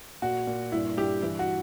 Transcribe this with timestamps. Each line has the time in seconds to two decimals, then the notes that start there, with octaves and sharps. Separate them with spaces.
0.22 A#2 F#4
0.47 A#2
0.72 G2 E4
0.97 G2 E4 G4
1.22 E3 E4
1.39 F#4